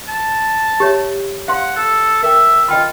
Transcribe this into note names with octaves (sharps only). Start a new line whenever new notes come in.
A5
G4 C#5 E5
F5 F#5 C6
A4
A#4 E5 G5
F4 D#5 G5 B5